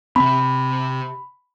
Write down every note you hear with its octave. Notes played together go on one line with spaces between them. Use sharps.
C3 C4 B5